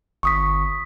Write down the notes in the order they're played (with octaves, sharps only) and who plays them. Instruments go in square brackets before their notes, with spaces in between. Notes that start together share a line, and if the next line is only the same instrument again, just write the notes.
[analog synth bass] G1 [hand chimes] C#6 D#6 B6